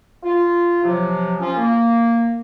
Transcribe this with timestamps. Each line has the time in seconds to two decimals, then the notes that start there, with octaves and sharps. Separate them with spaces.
0.23 F4
0.83 C3 F3 F#3
1.39 F3 C#4 F4
1.56 A#3